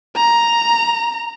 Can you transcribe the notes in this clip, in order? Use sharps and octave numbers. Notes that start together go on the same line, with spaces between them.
A#5